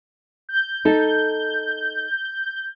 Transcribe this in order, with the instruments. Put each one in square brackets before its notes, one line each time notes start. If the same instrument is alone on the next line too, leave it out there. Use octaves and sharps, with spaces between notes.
[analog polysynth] G6
[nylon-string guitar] D#4 A4